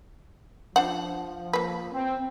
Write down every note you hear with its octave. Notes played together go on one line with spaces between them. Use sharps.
F3 D4 C5 F#5
A#3 B4
C4